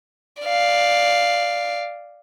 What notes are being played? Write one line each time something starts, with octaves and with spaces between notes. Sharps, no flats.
D5 F5